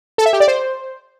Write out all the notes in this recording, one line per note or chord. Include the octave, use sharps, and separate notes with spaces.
A4
E5
G4
D5
C5